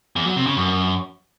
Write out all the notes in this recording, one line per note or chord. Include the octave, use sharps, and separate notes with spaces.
E2
F#3
C3
C#3
F#2